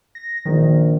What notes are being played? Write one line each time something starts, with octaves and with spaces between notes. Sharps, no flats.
A#6
A#1 D#3